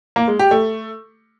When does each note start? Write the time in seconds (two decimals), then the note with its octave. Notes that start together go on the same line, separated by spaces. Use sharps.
0.16 A#3
0.28 G#3
0.39 G4
0.51 A3